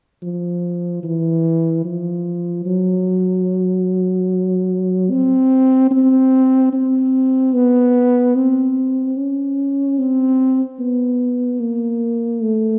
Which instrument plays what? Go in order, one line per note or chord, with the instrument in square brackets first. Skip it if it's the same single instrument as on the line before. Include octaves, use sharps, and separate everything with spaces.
[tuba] F3
E3
F3
F#3
C4
C4
C4
B3
C4
C#4
C4
B3
A#3
A3